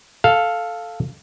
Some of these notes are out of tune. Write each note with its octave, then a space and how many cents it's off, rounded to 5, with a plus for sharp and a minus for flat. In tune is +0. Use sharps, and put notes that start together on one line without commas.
A4 +0 F5 +0